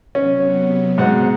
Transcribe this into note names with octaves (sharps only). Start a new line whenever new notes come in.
C3 F#3 B3 C#4
G#2 B2 F#5